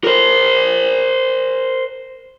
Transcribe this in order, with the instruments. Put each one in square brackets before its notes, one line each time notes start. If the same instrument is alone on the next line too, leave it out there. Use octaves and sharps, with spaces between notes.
[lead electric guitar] A#4 C5